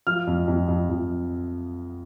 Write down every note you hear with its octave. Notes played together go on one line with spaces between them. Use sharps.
F3 F6
F2
F2
F2
F2